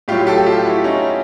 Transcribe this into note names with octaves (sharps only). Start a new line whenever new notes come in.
A2 F#3 F4 G4
G4 A4
F4 G4
E4 F#4
C#4 D#4